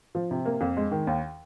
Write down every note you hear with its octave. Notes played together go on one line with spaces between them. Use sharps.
F3
C3
A#3
F2
G#3
D#3
D#2